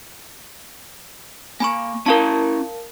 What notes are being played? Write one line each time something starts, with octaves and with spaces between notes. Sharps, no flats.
A#3 G#5 B5 C#6
C#4 E4 A#4 F5 A5 A#5